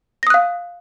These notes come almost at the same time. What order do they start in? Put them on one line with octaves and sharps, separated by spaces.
A#6 D#6 F#6 F5